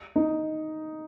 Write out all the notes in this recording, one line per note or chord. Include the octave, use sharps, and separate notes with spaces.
D#4